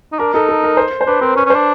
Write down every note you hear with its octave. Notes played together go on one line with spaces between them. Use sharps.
D#4
D4 A#4
D#4 A4
A4
A#4
C5
C5
D4 B4
C4 A#4
C#4 B4
C#4
D4 C5